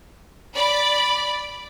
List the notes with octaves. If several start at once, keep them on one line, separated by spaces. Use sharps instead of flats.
D5 B5